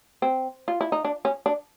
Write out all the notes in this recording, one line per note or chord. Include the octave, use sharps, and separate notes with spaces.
C4
F4
E4
D#4
D4
C#4
D4